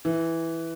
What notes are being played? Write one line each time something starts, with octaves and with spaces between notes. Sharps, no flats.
E3